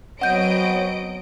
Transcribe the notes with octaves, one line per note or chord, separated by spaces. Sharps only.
F#3 B3 C4 C#5 D#5 F#5 G6 D7